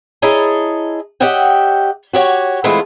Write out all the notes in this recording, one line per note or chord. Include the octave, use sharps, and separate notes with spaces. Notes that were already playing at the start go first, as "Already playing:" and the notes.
E4 G#4 C#5 D#5 A5 A#5
G4 C#5 D#5 E5 F#5 G5
F#4 G4 C#5
E3 G#3 A3 C4 E4 F4